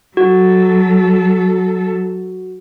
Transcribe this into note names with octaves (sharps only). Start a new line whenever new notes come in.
F#3 F#4 A4